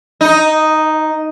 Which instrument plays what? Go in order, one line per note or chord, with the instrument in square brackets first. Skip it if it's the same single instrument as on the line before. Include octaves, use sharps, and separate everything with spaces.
[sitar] D#4